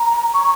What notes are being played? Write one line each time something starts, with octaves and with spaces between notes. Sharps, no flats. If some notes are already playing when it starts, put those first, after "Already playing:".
Already playing: A#5
C#6